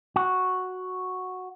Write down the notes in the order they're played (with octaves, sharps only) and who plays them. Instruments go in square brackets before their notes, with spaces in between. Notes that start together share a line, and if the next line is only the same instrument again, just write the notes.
[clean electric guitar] F#4